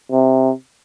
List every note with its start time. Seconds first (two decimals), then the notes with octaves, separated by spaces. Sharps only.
0.12 C3